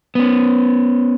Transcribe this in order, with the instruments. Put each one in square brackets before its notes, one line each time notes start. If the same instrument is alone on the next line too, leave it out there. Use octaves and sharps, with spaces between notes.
[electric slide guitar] B3 C#4